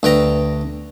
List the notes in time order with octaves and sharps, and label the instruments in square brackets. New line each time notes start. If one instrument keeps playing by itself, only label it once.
[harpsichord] D2 B4 G5 A#5